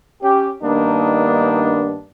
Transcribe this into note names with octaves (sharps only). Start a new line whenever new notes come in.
C#4 G4
G2 D#3 A#3 B3 D4 D#4